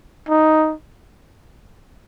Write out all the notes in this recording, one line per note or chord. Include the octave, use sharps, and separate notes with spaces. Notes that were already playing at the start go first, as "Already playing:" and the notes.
D#4